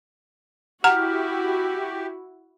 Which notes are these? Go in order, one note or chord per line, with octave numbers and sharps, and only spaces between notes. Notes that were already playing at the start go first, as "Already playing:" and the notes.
E4 F#4 G4 F#5 A#5 F6